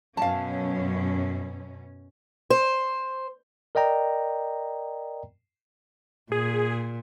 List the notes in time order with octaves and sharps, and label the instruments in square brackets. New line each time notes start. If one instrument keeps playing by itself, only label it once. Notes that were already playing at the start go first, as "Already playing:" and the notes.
[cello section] F#2 B2 C#4 [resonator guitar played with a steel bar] F5 A5
[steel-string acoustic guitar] C5
[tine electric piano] A#4 D5 D#5 G5 A#5
[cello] A#2 [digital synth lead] G#4